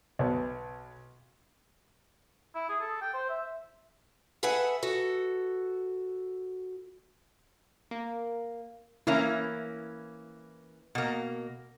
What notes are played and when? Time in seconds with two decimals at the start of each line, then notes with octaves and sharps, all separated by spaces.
0.19 B1 B3
2.55 E4
2.69 G#4
2.81 A4
3.02 G5
3.14 C5
3.29 E5
4.43 G#4 A4 B4 E5 F#5 G#5
4.83 F#4 A4
7.91 A#3
9.07 E3 A#3 C#4 E4
10.95 B2 A#3